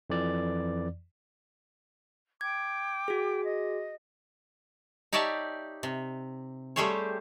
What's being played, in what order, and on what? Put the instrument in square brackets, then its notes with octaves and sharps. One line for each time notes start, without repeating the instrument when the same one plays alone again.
[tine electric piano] F2 E3 D5
[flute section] G5 D6 [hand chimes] G#6
[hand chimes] F#4 G#4
[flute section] D#5
[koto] D#4 G4 C#5 D5 E5 A5
C3
G3 A3 G4 G#4 C5 C#5